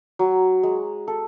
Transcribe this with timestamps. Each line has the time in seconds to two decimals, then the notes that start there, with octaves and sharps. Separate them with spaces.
0.19 F#3
0.63 G#3
1.08 A4